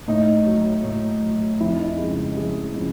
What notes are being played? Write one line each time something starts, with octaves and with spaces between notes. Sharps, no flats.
A2 D#4
F#3
A2
F#3
F2 E4
D#4
E4
C#3 F3 G#3
F2 G#4
C#3 F3 G#3